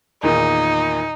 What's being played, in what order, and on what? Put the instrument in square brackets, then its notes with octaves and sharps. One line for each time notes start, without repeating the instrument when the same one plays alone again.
[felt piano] E2 A#2 D#3 [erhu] D#4